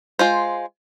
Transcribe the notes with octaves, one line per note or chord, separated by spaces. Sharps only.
G#3 F4 C5